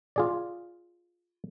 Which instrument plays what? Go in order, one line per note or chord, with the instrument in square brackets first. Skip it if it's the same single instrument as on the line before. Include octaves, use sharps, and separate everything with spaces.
[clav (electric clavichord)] F4 G#4 D5